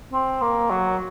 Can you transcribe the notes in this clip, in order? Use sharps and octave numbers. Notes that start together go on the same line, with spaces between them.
C4
A#3
F#3